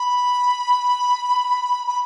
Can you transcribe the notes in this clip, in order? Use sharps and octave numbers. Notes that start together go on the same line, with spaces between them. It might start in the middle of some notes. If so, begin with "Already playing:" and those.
Already playing: B5
B5